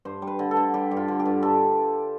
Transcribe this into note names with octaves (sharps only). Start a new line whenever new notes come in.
G2 C5
G3
B4
D3
A4
D3
G3 G4
G2
F4
D3
G4
G2
G2 A4